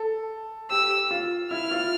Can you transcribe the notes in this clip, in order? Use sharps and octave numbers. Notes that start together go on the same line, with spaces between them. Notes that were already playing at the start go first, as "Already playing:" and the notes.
Already playing: A4
G4 E6
F4
E4 F6
F4